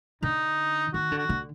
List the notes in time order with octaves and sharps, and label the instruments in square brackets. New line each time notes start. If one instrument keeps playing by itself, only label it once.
[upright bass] D3 [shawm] D#4
[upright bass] D#3 [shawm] F#4
[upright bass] D3
[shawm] F#4
[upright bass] D3